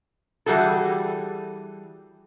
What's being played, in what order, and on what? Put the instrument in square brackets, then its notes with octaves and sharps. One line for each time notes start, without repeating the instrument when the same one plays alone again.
[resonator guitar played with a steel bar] E3 G3 F#4 G#4 A4